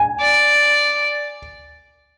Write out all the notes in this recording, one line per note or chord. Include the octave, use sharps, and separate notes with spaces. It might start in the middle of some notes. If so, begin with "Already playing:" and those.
Already playing: G#5
D5